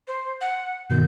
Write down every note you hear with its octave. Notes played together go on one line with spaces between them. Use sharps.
C5
F#5
G2 B2 D#3 G6